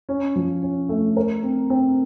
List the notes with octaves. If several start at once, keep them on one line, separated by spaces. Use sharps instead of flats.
C#4
F3
C#4
A3
A#4
C4
C4